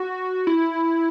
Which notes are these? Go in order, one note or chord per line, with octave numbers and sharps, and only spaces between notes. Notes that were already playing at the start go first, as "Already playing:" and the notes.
Already playing: F#4
E4